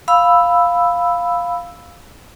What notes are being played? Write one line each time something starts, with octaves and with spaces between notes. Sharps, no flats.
F5 B5 E6